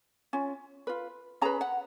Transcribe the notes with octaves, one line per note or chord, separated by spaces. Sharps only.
C#4 F4
F4 B4
C#4 G#4 B4 A#5
F#5